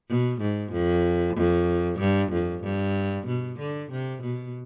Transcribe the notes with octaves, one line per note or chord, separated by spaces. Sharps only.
B2
G#2
F2
F2
G2
F2
G2
B2
D3
C3
B2